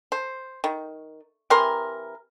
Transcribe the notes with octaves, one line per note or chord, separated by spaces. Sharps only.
C5
D#3
C3 E3 A#4 C6